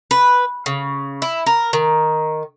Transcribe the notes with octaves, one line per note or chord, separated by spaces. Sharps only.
B4
C#3
E4
A#4
D#3